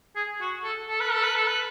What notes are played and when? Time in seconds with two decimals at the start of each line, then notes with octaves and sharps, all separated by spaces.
0.16 G#4
0.41 F#4
0.64 A4
0.88 A4
1.01 B4
1.12 A4
1.23 B4
1.35 A4
1.47 B4